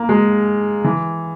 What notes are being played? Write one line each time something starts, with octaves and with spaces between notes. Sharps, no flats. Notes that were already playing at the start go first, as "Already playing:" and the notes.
Already playing: A#3
G#3
E3